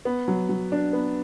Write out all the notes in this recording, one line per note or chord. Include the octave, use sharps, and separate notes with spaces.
B3
F#3
F#3
D4
B3